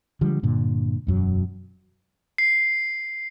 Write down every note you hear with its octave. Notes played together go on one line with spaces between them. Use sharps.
D3 F3 G3 G#3
G2 A#2 D3
E1 F#2 F#3
C7